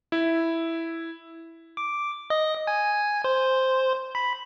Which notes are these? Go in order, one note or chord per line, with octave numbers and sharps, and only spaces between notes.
E4
D6
D#5
G#5
C5
B5